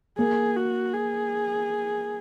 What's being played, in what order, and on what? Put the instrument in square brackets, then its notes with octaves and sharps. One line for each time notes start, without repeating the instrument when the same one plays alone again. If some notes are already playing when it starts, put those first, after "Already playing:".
[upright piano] A#3 [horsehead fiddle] G#4
[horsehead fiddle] F#4
G#4